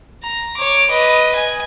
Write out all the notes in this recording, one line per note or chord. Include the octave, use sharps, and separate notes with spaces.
A#5
C#5 D6
B4 D#5
G#5